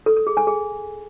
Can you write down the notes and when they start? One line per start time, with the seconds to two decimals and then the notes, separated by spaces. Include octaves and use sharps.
0.06 A4
0.16 A4
0.27 G#4
0.37 G#5
0.47 G#4